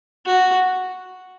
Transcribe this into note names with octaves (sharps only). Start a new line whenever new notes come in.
F#4